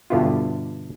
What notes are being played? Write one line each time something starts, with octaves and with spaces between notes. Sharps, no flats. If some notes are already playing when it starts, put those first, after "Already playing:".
G2 B2 D3 B3 E4 F4